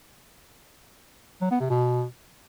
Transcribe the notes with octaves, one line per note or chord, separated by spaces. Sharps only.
F#3
B3
C3
B2